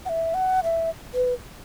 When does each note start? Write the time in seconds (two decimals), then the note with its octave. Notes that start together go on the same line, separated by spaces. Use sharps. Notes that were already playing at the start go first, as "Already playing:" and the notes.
0.05 F#5
0.09 E5
0.34 F#5
0.64 E5
1.14 B4